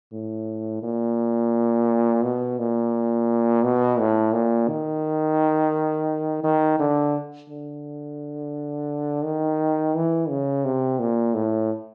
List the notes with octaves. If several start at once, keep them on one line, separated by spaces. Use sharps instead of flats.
A2
A#2
B2
A#2
B2
A2
A#2
D#3
D#3
D3
D3
D#3
E3
C#3
C3
A#2
A2